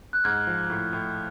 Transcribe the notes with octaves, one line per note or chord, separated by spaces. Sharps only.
F#6
G#2 F6 G#6
F3
A2
A2